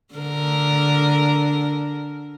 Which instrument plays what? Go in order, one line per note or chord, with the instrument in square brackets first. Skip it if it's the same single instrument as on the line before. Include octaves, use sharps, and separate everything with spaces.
[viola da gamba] D3 A#4